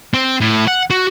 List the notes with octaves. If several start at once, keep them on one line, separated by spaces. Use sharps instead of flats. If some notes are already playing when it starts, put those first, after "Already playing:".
C4
A2
F#5
F#4